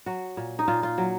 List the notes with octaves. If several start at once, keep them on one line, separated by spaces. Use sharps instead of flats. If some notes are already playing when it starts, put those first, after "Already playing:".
F#3 F#4
A#2
D#4
A#2 F4
F4
F#3